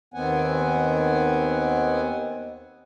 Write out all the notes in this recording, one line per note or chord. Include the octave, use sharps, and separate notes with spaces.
D#2 D#3 B3 C4 F#5 G#5